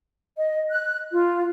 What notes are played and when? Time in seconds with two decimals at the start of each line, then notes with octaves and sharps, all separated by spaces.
0.38 D#5
0.71 F#6
1.12 F4